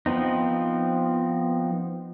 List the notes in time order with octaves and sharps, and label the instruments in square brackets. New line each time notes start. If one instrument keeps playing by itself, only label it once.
[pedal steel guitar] F3 B3 C4 D#4